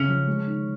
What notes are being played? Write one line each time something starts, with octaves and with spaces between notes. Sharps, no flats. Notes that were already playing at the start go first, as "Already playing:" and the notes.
Already playing: C#3 C#4
F3
G#3
D#3